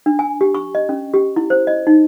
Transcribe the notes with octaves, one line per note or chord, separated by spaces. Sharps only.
D4
G#5
G4
C#6
D#5
C#4
G4
E4
C5
D#5
D#4